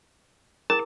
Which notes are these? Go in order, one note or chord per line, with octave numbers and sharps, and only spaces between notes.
E4 G#4 A#4 A5